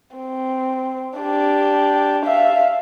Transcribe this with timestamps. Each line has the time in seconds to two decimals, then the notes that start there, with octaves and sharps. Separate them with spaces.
0.17 C4
1.19 D4 G4
2.26 E5 F5